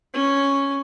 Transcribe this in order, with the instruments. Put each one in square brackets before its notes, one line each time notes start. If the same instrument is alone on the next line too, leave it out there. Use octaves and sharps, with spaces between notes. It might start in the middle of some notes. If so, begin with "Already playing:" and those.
[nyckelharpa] C#4